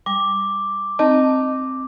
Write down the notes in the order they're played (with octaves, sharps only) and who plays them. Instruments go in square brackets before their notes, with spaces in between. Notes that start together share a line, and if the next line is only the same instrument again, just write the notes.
[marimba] G3 [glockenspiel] D6
[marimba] C4 A5 [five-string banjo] D#4